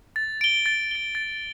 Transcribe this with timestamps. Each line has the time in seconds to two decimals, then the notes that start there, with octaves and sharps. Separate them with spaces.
0.16 A6
0.41 D7 G7
0.66 A6
0.91 D7 G7
1.15 A6